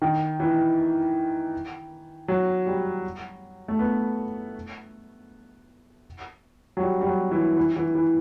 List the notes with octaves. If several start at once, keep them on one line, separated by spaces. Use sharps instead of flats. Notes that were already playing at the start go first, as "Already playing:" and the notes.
D#3
E3
F#3
G3
A3
B3
F#3
G3
G3
F#3
E3
E3
E3
E3